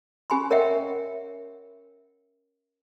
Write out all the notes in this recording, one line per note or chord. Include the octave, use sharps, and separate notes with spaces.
C#4 G4 G#5 B5 C6
A#4 C#5 D#5 E5 F#5 G5